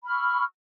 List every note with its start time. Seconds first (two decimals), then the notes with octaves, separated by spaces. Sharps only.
0.04 B5
0.07 F6
0.10 C#6
0.12 E6